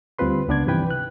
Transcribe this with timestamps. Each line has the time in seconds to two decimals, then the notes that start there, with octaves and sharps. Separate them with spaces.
0.19 D2 G3 C4 F4 B4 C6
0.48 C#2 B3 D4 D5 G#6
0.66 G2 C3 D#3 E3 B4 G5
0.91 F#6